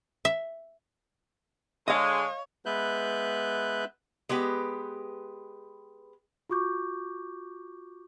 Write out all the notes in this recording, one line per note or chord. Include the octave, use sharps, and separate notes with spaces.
E5
D3 G#3 C#5 D#5 F5
G#3 B3 B4 E5 F#6 G6
G#3 B3 G4 B4
F4 F#4 C#6 D6 G6